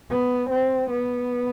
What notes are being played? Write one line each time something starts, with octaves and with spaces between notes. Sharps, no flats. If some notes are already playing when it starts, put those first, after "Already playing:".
B3
C4
B3